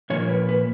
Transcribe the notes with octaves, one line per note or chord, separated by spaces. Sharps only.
A#2 F3 A#3 C#5
B4
B4